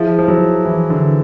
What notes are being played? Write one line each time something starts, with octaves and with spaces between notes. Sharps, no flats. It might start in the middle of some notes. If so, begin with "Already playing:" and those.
Already playing: F3 E4 G#4 C5 E5
F3
F#3
E3
D3